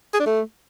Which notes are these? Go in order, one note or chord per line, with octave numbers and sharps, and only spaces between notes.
G#4
D4
A3